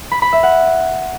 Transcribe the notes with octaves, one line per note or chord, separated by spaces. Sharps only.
B5
B5
E5
F#5